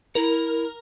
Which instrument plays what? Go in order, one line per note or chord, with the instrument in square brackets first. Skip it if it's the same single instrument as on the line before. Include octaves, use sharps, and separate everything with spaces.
[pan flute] E4 [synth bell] A#4